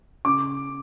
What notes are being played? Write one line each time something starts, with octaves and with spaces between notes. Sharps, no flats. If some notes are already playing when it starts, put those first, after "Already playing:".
C#3 D6